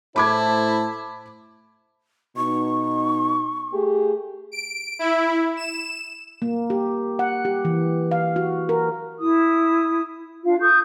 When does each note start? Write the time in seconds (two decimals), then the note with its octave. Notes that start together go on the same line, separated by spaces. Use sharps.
0.16 A2 E4 C5 A5 B5 D6 G#6
2.37 B2 D#4 C#6
3.72 A3 G4 G#4
4.52 D7
4.99 E4
5.57 E7
6.42 A#3
6.70 G4
7.19 F#5
7.45 G4
7.65 E3
8.11 F5
8.36 F#4
8.69 A#4
9.19 E4 D#6
10.44 D4 F4 F5
10.60 A4 C#6 D#6 G6